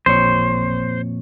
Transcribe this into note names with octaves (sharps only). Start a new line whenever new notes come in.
A1 F2 A#2 C5 C#5